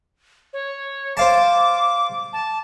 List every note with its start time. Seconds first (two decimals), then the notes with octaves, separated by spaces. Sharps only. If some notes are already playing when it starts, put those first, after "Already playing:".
0.53 C#5
1.17 C5 F5 A5 D6
2.33 A5